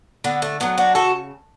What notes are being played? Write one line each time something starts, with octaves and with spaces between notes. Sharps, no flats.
D3 B3
A3
F#3 A3 B3
D4 F#4
C#3 F#4 A4